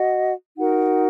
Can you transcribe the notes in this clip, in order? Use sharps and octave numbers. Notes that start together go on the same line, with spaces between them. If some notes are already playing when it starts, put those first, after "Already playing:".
Already playing: F#4 D#5 F#5
D#4 F#4 A#4 F#5